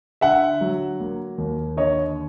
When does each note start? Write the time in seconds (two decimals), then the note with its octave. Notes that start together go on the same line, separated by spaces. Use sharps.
0.21 D3 E5 F#5
0.61 F#3
1.00 A#3
1.38 D#2
1.77 D3 C#5 D#5